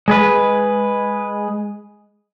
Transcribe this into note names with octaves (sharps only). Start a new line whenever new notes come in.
G#3 G#4 B4